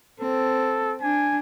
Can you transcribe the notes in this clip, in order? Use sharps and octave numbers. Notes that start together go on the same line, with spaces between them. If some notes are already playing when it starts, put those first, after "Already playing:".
C4 A4
D4 G#5